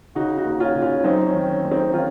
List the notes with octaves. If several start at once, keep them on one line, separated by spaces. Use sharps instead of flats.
C#3 D#4 F#4
D#4 F#4
D#2
C#4 F4
C#3
C#4 F4
F#2 C4 D#4
C#4
D#3
C#4
F#1
C4 D#4
D#3 C#4 F4